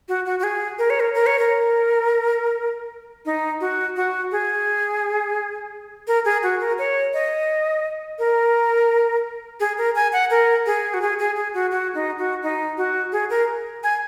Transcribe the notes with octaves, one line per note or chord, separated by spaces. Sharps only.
F#4
F#4
F#4
G#4
A#4
C#5
A#4
A#4
C#5
A#4
D#4
F#4
F#4
G#4
A#4
G#4
F#4
A#4
C#5
D#5
A#4
G#4
A#4
G#5
F#5
A#4
G#4
F#4
G#4
G#4
G#4
F#4
F#4
D#4
F#4
D#4
F#4
G#4
A#4
G#5